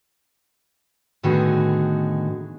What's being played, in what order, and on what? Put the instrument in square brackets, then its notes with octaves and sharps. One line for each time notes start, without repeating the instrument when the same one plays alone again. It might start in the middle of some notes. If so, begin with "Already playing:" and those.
[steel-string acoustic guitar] A2 D3 D#3 B3 F#4 G#4